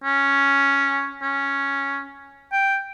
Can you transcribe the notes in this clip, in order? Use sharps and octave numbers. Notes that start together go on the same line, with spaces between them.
C#4
C#4
G5